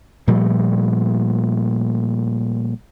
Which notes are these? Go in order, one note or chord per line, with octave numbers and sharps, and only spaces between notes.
A#2 F3 G3 A3